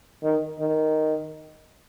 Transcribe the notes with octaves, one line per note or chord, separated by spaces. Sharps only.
D#3
D#3